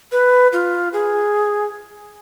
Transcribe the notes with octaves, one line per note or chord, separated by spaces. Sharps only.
B4
F4
G#4